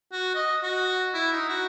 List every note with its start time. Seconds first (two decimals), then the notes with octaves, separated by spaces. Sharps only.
0.12 F#4
0.35 D#5
0.63 F#4
1.14 E4
1.33 D#4
1.49 F#4